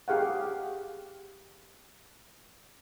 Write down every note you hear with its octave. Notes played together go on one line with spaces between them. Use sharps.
G4 G#4 F5 F#5